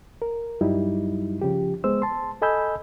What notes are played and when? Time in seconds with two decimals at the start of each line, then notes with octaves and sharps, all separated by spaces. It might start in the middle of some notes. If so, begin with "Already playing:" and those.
0.22 A#4
0.61 G2 F#3 G3 D#4 E4
1.42 C#3 F3 G4
1.84 G#3 B3 C5 E6
2.02 A5 C6
2.42 A4 D#5 G#5 B5 E6 G6